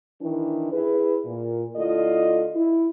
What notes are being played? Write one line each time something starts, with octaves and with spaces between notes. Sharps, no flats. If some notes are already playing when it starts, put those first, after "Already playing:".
D#3 E3 D4 E4
E4 G#4 B4
A#2
D3 A3 E4 F4 D5 D#5
E4